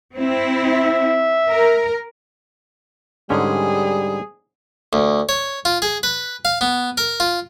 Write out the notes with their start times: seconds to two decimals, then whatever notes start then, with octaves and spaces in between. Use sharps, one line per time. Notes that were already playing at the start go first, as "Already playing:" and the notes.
0.16 C4 E4
0.72 E5
1.49 A#4
3.30 G#2 D3 G3 C#4 G#4
4.93 D2
5.29 C#5
5.65 F4
5.82 G#4
6.03 B4
6.45 F5
6.61 B3
6.97 A#4
7.20 F4